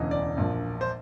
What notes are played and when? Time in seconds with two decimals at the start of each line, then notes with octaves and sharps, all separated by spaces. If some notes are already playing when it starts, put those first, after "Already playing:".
Already playing: E1 D2 C#3 E3 D#5
0.11 D5
0.37 A#1 A#2 F3
0.81 C5